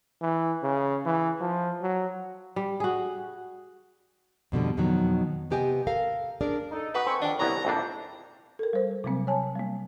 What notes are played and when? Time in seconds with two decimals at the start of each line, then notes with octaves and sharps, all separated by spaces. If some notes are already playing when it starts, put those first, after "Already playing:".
0.22 E3
0.63 C#3
1.05 E3
1.41 F3
1.82 F#3
2.56 G3
2.80 F#4 G#4
4.52 F2 B2 D3 G3
4.77 F2 B2 D#3 F#3
5.50 C3 B3 G4 D#5 G#5
5.87 A4 A#4 F5
6.41 D4 G#4 A#4 D5
6.71 D#4 A4
6.94 F#4 B4 D#5
7.07 C4 A4 G#5 C#6
7.22 F2 D#3 D4 D#5 G5
7.39 C2 G3 B3 E4 C#5 A#5
7.65 A#1 F2 D4 E4 A4 C5
8.59 A4 A#4
8.73 G3 C5
9.04 C3 F#3 G3 A#3 C4
9.27 C#5 G#5 A5
9.56 G3 A#3